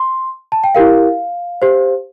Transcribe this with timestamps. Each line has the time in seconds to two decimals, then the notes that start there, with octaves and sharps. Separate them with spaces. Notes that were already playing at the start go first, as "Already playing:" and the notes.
Already playing: C6
0.52 A5
0.64 G5
0.75 E4 G4 A#4 F5
1.62 G4 C5